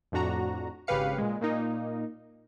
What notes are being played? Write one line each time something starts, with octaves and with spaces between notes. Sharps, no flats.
F2 A2 D4 F#4 A#5
G#1 C#3 G4 B4 F5 C#7
A#2 G#3
A#2 A#3 D#4